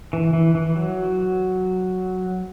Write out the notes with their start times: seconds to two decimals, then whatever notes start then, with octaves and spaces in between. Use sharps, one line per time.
0.13 E3
0.33 E3
0.55 E3
0.76 F#3